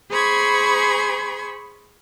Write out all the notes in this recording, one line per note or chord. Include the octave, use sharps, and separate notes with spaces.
G#4 C5 B5 C#6 G#6